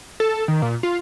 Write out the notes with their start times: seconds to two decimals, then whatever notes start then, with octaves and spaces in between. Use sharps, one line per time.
0.20 A4
0.48 D#3
0.62 A#2
0.83 F4